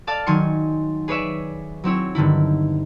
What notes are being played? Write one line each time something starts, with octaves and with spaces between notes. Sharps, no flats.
A4 D5 F5 A5 F6
D#3 F#3 G#5 C6 C#7
G#4 B4 C#5 D5 E5 G#5
F#3 C4 E4 C#5
G2 D3 D#3 E4